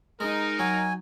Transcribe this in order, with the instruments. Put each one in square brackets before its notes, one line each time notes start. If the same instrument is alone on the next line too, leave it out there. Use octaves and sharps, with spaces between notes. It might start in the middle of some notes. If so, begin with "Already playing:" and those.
[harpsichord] G#3 [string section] D#4 [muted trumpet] A#4
[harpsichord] F#3 [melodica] G#5